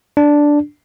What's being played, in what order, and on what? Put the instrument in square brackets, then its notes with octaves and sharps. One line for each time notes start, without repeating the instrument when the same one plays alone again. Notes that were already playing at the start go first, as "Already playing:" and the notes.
[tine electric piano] D4